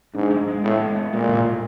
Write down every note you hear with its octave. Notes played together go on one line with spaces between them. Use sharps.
G#2 D4
G#3
G#3
A2 B3
G#3
B3
A#2 G#3
A2
A2